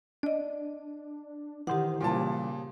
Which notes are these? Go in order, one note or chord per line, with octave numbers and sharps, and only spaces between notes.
D4 D5 D#5
D#3 E3 G4 C5 F#5
A#2 C#3 G3 A5